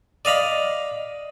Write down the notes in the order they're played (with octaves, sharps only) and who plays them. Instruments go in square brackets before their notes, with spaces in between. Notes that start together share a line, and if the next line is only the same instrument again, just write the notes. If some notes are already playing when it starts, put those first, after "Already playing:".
[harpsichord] D5 D#5 F5 B5